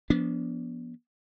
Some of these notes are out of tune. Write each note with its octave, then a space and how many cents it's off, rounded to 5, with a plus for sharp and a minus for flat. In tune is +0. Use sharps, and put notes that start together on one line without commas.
F3 -20 B3 -30 D4 -35